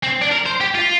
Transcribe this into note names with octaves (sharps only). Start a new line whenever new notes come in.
C4
D4
A#4
C5
G4
F4